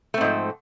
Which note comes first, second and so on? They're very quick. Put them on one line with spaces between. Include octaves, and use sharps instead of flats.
A3 C4 G#2 F3